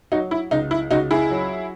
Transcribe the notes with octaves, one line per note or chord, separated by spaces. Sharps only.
F#3 D#4 F#4
E4
C#2 D#4
E4
C#2 D#4 F#4
E4 G#4
F#3